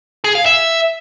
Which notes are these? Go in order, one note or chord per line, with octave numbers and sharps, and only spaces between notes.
G#4
F5
E5